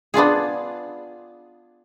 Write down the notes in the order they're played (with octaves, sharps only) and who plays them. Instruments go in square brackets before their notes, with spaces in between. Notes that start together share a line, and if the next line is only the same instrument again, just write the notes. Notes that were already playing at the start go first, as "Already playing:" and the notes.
[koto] B3 D4 F4 G#4